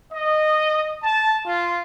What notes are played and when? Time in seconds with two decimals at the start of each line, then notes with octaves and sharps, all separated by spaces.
0.12 D#5
1.03 A5
1.44 F4